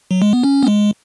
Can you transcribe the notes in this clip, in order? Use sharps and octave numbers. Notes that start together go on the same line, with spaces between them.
F#3
G#3
B3
C#4
B3
G#3